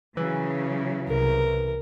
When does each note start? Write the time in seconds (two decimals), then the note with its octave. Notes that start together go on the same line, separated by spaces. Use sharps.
0.17 C#3 E3 F#3
1.08 C2 A#4